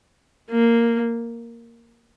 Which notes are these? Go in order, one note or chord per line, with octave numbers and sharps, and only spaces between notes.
A#3